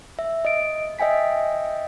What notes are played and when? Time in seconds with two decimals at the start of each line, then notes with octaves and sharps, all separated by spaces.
0.19 E5
0.45 D#5 D7
0.99 D#5 E5 G5 G#5 B6